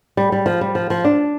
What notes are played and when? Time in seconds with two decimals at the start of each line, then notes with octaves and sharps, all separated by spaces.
0.17 G3
0.32 G3
0.46 F3
0.61 G3
0.75 F3
0.90 F3
1.05 D4